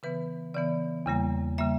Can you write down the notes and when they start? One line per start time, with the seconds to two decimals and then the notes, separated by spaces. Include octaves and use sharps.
0.03 C#3 E3 B3 B4
0.54 C#3 E3 B3 D5
1.06 E2 C#3 G3 A#3
1.58 C#3 G3 A#3 E5